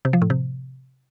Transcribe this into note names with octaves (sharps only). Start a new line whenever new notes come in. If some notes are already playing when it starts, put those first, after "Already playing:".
C3
F3
A2
C3